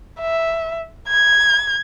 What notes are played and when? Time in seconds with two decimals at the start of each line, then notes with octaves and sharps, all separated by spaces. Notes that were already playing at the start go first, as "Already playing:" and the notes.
0.20 E5
1.08 G#6